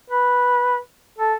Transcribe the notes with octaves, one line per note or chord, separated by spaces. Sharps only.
B4
A4